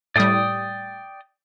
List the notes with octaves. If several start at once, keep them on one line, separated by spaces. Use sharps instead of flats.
A2 G3 D5 G5 D#6